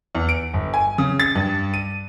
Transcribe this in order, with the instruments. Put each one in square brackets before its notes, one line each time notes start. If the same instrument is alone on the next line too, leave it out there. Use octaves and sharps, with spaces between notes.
[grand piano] E2
D7
G1
G#5
C#3
A6
G2
D#7